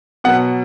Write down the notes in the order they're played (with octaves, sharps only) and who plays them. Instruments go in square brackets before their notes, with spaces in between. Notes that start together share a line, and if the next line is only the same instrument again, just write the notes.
[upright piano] B2 F#3 B3 [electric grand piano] F#5